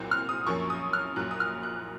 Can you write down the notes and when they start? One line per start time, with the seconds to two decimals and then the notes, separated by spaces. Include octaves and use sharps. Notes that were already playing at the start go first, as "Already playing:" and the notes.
Already playing: C2 A#2 F#3 C4
0.11 F6
0.29 D#6
0.47 F#2 F3 A#3 C#4 C#6
0.70 D#6
0.93 F6
1.16 A#1 A#2 F#3 F#6
1.31 D#6
1.40 F6
1.63 F#6